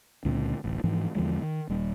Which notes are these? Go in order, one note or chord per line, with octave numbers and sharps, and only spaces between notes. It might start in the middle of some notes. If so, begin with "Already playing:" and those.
C#2 A#2 D3 C4
D1 A1
G#2 E3 F3
E2 D3 F3 G#3
D#3
D#1 G3